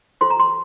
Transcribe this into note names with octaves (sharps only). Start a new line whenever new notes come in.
F4 A4 C5 C6
A#5
C6